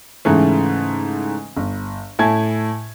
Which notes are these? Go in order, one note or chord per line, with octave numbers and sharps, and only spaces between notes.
G#2 C#3 E3 A3
G1
A2 E4 G#5 A5 G#6